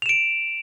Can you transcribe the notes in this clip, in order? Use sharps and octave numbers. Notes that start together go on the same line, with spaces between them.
D7 E7 F7